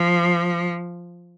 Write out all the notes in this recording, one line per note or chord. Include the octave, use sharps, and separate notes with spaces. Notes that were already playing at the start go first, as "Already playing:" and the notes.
Already playing: F3